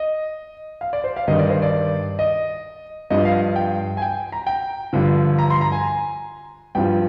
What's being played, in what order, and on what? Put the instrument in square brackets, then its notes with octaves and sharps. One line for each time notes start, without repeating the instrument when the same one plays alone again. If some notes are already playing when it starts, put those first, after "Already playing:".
Already playing: [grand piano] D#5
F5
D5
C5
F5
G2 D#3 D#5
D5
C5
D5
D#5
G2 F3 D#5
F5
G5
G#5
G5
A#5
G5
G2 D3 F3
A#5
C6
A#5
G#5
G2 F3 G5